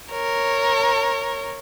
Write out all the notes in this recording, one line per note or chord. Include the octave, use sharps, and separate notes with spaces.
A#4 C#5